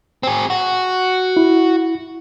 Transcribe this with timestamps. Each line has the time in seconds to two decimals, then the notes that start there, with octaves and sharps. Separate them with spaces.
0.23 C4 G#4
0.50 F#4
1.37 E4